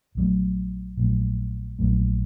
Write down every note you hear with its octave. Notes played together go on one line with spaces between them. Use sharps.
A#1 A#2 F#3 A3
A#1 A#2 F#3 A3
A#1 A#2 F#3 A3